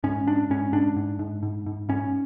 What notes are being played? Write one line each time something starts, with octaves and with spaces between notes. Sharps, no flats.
G#2 C#4
G#2 D4
G#2 C#4
G#2 D4
G#2
G#2
G#2
G#2
G#2 C#4